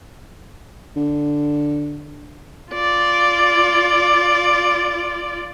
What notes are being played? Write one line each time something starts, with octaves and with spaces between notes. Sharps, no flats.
D3
F4 D5